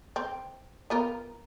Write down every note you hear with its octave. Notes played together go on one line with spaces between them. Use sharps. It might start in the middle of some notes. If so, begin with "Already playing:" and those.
C4
B3 F4 A#4